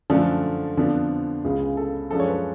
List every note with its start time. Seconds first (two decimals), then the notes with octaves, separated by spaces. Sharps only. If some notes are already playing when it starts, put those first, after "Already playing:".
0.10 F#2 D3 F3 A3 D4 A4
0.77 F2 D3 F3 B3 D4
1.45 C#2 C#3 G#3
1.77 A4
2.11 F#2 F3 G#3 D4 A4
2.20 C#5
2.28 B4